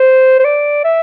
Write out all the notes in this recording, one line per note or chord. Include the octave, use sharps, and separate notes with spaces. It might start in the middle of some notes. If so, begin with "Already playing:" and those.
Already playing: C5
C5
D5
E5